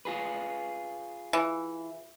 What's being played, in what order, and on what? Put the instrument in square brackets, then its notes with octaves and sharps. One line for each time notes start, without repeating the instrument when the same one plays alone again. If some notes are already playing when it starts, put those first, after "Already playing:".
[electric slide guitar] F4 G#4 B4
[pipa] E3